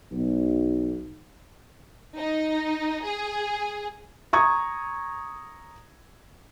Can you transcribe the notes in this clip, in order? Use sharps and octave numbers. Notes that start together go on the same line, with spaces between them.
B1
D#4
G#4
A#5 C#6 D#6 G#6